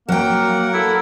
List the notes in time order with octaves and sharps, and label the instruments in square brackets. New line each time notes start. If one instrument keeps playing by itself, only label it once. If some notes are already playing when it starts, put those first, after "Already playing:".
[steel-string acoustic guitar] F#3 G5 [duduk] A#3 [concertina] A#4 F#5
[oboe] E4 [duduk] A4